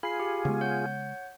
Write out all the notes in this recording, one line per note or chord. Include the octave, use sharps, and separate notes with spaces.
F4 G#4 B5 C7
G4
C#3 G#3 B3
C#5 F#5 G6